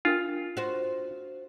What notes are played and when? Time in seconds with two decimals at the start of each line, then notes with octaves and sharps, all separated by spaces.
0.05 D4 F4 A#4 G5
0.57 F#4 C5